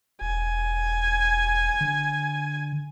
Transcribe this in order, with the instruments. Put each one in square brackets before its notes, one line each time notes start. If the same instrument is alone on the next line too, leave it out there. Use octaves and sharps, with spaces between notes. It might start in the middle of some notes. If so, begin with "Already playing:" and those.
[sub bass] E1 [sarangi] G#5
[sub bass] D3